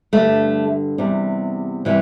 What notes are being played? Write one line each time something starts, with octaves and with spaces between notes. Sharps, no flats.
G2 D3 G3 A3
E2 C3 G3
C3 E3 G3